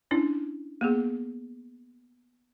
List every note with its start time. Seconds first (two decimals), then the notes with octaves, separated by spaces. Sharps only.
0.11 C#4 D4 E4
0.81 A#3 B3 G#4